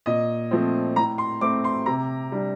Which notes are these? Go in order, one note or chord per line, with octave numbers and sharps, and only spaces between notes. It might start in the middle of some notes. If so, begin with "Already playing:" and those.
A#2 D#5
F3 A3 C4
A2 A#5
C6
A3 C4 D6
C6
C3 A#5
G3 D4